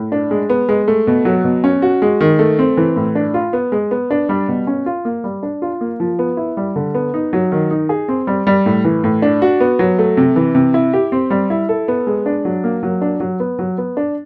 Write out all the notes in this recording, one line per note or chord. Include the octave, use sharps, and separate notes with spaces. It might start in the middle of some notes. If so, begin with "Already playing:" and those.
Already playing: A2
D4
G#3
B3
G#3
A3
B2
F#3
B2
C#4
F#4
G#3
D#3
A3
C4
E3
A2
D4
F4
B3
G#3
B3
D4
G3
B2
C#4
F4
A#3
G3
D4
F4
A#3
F3
B3
E4
G3
D3
B3
D#4
F#3
D#3
D#4
G#4
C4
G3
G3
A2
E3
A2
D4
F#4
B3
F#3
A3
C3
E3
C3
E4
G4
C4
G3
E4
A4
B3
G#3
D4
F#3
A#3
F#3
D4
F#3
B3
F#3
B3
D4